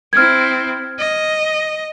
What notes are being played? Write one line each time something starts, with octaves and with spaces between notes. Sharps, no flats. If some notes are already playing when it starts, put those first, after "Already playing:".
C4 E4 F6 G#6
D#5